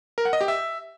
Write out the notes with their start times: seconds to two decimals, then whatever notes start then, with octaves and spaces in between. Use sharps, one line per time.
0.18 A#4
0.25 F#5
0.33 D#5
0.41 G4
0.48 E5